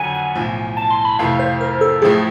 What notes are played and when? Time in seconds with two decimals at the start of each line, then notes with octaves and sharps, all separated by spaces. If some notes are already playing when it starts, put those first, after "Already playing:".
Already playing: F#1 F2 D3 F#3 F#5 G#5
0.15 G#5
0.35 B1 A2 F3
0.77 A5
0.91 C6
1.05 B5
1.19 F2 C3 E3 A3 F5
1.39 C5
1.61 A#4
1.81 A4
2.02 A1 A2 F3 A3 G#4